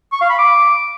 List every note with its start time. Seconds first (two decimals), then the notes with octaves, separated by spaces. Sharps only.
0.13 C#6
0.21 F5
0.30 B5
0.38 D6